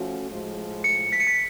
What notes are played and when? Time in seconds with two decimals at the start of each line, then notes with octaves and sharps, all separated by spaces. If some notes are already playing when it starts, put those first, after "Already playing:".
Already playing: F3 A3 C#4 F#4
0.29 A2 F3 G#3
0.84 C#7
1.12 B6
1.20 C#7
1.27 B6